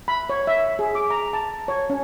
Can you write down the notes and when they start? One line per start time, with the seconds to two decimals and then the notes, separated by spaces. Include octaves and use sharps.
0.08 B5
0.30 C#5
0.47 E5
0.79 G#4
0.95 D6
1.11 A#5
1.33 A5
1.68 C#5
1.90 C#4